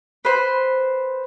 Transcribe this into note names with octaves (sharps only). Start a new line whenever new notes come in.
B4 C5